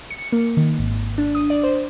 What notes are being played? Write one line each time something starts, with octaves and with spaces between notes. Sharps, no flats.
C#7
A#3
D#3
G#1
D4
D#6
D5
C5